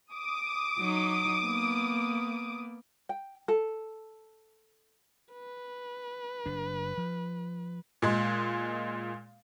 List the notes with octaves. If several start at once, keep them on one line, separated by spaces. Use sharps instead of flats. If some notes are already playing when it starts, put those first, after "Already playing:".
D6 D#6
F#3 D#4
A#3 B3
G5
A4
B4
F#1 D4
F3
A#2 G#3